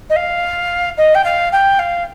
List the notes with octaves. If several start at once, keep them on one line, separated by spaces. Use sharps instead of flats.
D#5
F5
D#5
G5
F5
G5
F5